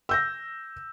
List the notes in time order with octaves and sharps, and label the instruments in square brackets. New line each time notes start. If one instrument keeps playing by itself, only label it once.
[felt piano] E6 G6 A#6